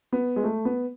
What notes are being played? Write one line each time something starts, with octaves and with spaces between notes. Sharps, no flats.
B3
G#3
A3
B3